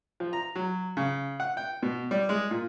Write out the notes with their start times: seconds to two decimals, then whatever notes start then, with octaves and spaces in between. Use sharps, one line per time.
0.20 F3
0.33 A#5
0.55 F#3
0.97 C#3
1.40 F#5
1.57 G5
1.83 B2
2.11 G3
2.29 G#3
2.51 A#2